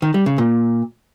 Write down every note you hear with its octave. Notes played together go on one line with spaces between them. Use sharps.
D#3
G3
C#3
A#2